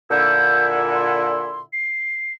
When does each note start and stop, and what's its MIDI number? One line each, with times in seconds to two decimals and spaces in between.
0.11 1.60 46
0.11 1.60 50
0.11 1.60 64
0.11 0.67 91
0.95 1.60 84
1.73 2.33 96